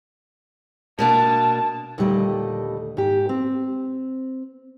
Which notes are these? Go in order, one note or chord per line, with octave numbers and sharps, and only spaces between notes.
B2 A#3 D4 A5
D#2 A#2 D3 G3 A3 D#5
G#2 G4
C4